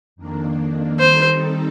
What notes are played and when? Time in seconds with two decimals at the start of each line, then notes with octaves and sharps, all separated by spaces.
0.16 F2 D#3 A#3 D4
0.99 D#3 G3 C4 D#4 A4 C5